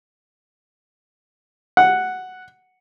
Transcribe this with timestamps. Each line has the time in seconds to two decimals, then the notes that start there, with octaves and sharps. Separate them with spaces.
1.77 F#5